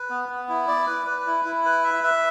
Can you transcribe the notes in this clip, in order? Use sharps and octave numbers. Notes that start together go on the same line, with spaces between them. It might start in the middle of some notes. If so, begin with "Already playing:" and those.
Already playing: B4
B3
B3
E4
D5
B4
B4
E4
E4
B4
E5
E5